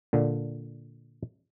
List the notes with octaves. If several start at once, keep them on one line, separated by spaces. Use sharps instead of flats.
A#2 D3